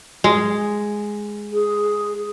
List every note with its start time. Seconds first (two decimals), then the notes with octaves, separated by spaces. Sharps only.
0.24 G#3
1.53 G#4